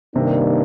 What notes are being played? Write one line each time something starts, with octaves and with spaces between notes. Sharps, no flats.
G2 C3 D#3 A#3 D4